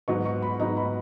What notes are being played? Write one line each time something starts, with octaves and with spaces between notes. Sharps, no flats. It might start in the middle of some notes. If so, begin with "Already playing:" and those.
G#2 F#3 B3 D#4 C#6
C#6
B5
G#2 F#3 B3 D#4 A#5
B5